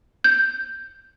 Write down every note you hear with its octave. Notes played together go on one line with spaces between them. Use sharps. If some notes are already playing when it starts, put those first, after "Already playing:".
G6